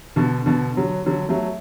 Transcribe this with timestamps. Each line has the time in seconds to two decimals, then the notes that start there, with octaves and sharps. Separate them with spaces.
0.16 B2 D3
0.46 B2 D3
0.77 D3 F#3
1.06 D3 F#3
1.29 F#3 A3